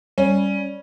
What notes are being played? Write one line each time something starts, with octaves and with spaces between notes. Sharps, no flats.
G3 C#4